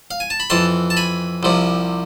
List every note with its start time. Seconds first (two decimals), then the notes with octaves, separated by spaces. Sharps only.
0.11 F5
0.20 G#5
0.30 A5
0.40 B5
0.50 F2 E3 A5 C6
0.90 A5
0.97 G#5 B5
1.43 C2 C3 F3